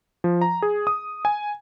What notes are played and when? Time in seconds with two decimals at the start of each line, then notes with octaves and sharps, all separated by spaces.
0.24 F3
0.42 A#5
0.62 G#4
0.87 D#6
1.25 G#5